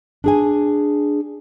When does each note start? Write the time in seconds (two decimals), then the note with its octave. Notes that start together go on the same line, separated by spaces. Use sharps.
0.24 D4 G#4 G#5